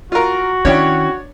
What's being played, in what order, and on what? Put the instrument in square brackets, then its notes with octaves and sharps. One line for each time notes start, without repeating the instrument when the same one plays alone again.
[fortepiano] F4 A#4 [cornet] F#4
[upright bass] D#3 [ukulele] C#4 E4 G5 [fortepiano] D4 C#5